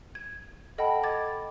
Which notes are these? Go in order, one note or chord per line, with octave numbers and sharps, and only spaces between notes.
G#6
A4 D#5 F#5 G5 A5 B5
D6 G#6 A6